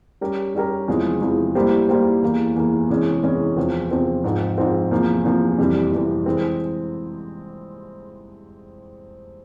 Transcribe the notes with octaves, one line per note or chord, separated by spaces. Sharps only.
G3 C#4 G4 A#4
G3 C#4 G4 A#4
E2 C3 F3 G#3 E4
E2 C3 F3 G#3 E4
G3 A#3 E4 G4 C5
G3 A#3 E4 G4 C5
E2 E3 A#3
E2 E3 A#3
E2 C3 E3 G#3 C#4
E2 C3 E3 G#3 C#4
E2 C3 F3 C4
E2 C3 F3 C4
G#2 F3 C4
G#2 F3 C4
E2 C3 F3 A#3
E2 C3 F3 A#3
F2 C3 E3 G3
F2 C3 E3 G3
E3 G#3 C4